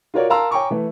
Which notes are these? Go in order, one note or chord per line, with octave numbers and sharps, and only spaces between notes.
F4 F#4 A#4 C#5 D5
A#4 F5 A5 A#5 C6 E6
C#5 G5 G#5 A#5 C#6 D6
E3 A3